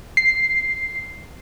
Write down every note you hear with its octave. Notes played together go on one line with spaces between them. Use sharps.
C7